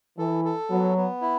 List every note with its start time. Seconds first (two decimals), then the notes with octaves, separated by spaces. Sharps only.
0.18 E3 A4
0.45 A4
0.70 F#3 B3
0.96 B3
1.22 E4